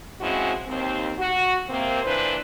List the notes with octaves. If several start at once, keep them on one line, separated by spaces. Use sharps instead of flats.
F3 G#3 C4 C#4 E4 F#4
D#2 C4
F#4
C3 A#3 C4
A#2 E3 D4 B4 C5